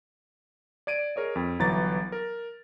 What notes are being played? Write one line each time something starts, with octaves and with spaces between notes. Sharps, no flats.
D5 G#6 D7 D#7
G#4 A#4 C#5 D#5
F2
G1 E3 F#3 A#5 A6
A#4